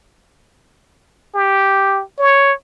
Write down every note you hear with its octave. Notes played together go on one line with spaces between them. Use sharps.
G4
C#5